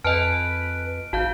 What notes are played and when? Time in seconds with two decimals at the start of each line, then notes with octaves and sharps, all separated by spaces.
0.04 F2 B4 D#5 G#5 A5 F6 D7
1.13 G#1 F#4 F5 A5 G6